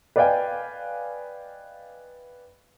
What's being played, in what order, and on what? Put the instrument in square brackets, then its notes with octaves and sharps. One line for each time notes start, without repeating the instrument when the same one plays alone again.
[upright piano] B4 D5 D#5 F5 G5 G#5